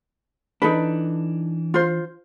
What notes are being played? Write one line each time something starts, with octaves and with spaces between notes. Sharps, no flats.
E3 D4 D#4 A4 B4
F4 C5